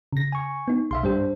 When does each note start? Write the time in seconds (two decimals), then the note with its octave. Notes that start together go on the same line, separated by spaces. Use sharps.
0.13 C#3 A#6
0.32 G#5 C#6
0.68 B3 D#4
0.91 B1 E5 F5 C6
1.03 G2 G3 D4 G4 C5